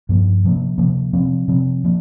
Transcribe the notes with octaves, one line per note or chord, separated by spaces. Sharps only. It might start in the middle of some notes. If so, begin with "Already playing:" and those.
G2 F3 A#3
C3 F3 A#3
C3 F3 A#3
C3 F3 C4
C3 F3 C4
F3 A#3